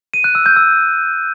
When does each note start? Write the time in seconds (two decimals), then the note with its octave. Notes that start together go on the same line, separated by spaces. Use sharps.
0.14 D#7
0.24 F#6
0.35 E6
0.46 G6
0.56 E6